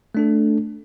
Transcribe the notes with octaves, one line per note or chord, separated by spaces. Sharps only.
A3 D4 A4